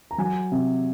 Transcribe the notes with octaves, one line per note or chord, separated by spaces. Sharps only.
A#5
F#3 G#5
C3